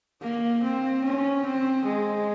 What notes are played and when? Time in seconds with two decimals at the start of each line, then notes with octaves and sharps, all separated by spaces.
0.22 A#3
0.63 C4
1.04 C#4
1.45 C4
1.85 G#3